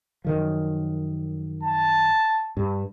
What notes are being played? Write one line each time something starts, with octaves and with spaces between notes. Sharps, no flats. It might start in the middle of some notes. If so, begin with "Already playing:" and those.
F#2 D#3 F3
A5
G2